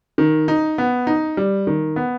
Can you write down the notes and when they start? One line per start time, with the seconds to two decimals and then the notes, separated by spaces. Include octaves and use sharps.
0.18 D#3
0.48 D#4
0.78 B3
1.07 D#4
1.37 G3
1.67 D#3
1.96 B3